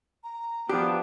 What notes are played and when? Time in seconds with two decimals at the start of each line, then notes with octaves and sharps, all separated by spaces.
0.24 A#5
0.69 F3 B3 D4 G4